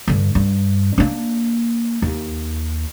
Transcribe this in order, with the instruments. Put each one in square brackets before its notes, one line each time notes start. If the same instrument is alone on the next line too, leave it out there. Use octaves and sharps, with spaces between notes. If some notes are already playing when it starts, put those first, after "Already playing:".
[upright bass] G2 D3
G2
A#3 D4
D#2